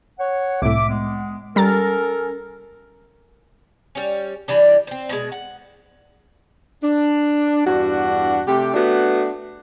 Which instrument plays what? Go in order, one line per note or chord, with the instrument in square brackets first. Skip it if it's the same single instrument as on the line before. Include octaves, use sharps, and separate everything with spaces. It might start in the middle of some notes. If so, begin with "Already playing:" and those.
[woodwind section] C#5 F#5
[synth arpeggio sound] C2 A2 [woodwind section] E5 D6
[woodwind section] G#3 B3
[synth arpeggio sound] G3 A#5 A6 [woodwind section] C#4 A4 A#4
[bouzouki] G3 C#4
E3 G3 D4
C4 C5
B2 F3 G#3
F#5
[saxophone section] D4
E2 G2 D4 F#4
C3 A3 G4
A3 B3 D4 F#4